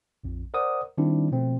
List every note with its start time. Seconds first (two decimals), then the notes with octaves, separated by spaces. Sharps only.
0.24 A#1 F2
0.54 A#4 C5 D5 F#5 D#6
0.98 D#3 G3 C4 D4 E4
1.32 B2 F3 A3 C4